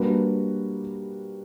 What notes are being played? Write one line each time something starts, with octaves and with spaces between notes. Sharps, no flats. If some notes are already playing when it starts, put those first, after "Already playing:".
Already playing: G3 A#3 D4 F#4 B4